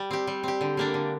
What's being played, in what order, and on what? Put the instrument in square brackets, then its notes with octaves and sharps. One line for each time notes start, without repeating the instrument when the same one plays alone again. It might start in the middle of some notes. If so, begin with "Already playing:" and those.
Already playing: [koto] G3
C4 G4
G3
C4 G4
D3
G3 A#3 D4
D3